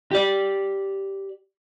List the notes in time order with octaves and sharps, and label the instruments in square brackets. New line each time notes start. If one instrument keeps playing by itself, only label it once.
[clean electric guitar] G4 D5